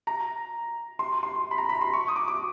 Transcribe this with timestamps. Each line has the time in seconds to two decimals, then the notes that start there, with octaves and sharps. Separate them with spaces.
0.07 A#5
0.99 C6
1.23 C6
1.51 B5
1.58 A#5
1.69 B5
1.81 C6
1.93 C#6
2.08 D#6
2.16 D6
2.28 D6